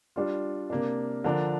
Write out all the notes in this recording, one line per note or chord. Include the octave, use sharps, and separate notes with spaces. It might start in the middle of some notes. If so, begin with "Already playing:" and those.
G3 D4 F4
C3 A#3 D4
D3 F3 D4 A#4